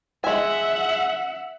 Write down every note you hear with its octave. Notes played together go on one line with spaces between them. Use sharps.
G#3 E5 F#5 G#5